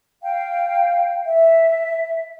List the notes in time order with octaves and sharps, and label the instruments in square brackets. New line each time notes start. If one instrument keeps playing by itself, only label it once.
[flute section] F5 G5
E5